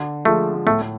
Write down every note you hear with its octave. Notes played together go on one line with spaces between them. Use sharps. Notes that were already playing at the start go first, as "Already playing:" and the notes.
Already playing: D3
F3 G#3 A3
A2 A3